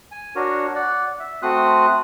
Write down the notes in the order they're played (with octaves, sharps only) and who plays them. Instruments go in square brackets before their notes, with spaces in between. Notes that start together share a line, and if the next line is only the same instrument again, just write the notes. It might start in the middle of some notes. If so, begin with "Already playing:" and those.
[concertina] G#5
D4 F#4 A#4 C#5
D5 F#5
E5
A3 C4 F#4 C6 D#6 F#6